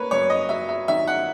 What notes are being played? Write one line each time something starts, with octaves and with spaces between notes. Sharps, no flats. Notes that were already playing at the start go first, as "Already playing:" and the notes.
Already playing: A#3 B4 C#5
F#2 C#5
D#5
F#3 E5
E5
D#3 E5
F#5